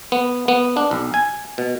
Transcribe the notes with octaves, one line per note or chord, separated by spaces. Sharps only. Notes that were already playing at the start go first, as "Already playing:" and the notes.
B3
B3
D4
B1
G#5
B2